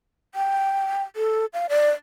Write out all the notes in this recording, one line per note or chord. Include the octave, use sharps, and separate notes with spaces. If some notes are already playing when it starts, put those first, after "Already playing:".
G5
A4
F5
D5